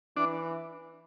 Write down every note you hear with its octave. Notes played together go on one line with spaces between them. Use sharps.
E3 D4